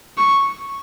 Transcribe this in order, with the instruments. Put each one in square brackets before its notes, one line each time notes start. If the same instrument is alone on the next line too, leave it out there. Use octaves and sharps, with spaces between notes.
[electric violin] C#6